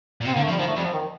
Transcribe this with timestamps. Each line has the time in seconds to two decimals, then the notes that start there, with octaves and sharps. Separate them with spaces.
0.21 A#2
0.25 C3
0.28 C4
0.35 D3 A#3
0.44 A3
0.48 F3
0.51 G3
0.59 D#3 F3
0.67 A3
0.76 F2 G3
0.84 F3
0.93 D#3